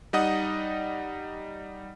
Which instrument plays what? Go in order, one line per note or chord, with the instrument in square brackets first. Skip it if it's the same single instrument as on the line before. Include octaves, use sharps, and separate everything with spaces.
[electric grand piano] G3 D#4 D#5 F#5 D#6